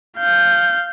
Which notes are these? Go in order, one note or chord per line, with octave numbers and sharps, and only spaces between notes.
F5 G6